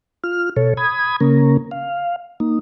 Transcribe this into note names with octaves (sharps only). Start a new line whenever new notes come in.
F4 F6
B2 A4 C#5
B5 D#6 G#6
C#3 A#3 C#4 A#4
F5
A#3 D#4